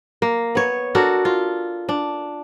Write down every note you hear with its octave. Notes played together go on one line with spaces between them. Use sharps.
A#3
B3 C#5
D4 F#4 A4 A#4
F4
D4